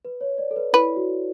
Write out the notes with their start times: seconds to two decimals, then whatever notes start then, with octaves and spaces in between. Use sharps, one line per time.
0.05 B4
0.21 C#5
0.38 D5
0.51 A4
0.56 B4
0.73 E4 B4
0.96 F#4